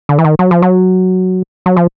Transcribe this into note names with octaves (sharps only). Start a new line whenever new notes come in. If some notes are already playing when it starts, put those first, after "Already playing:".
D3
E3
D#3
F#3
F3
F#3
F#3
F3